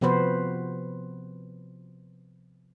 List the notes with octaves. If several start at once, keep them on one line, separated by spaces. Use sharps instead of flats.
C3 F3 B3 F#4 B4 C5